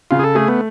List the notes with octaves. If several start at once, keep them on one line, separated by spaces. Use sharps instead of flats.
C#3 F4
G#4
A4
A3 G#4
B3